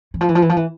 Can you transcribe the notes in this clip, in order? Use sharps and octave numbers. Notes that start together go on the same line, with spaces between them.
E3
F3
E3
F3
E3
F3
E3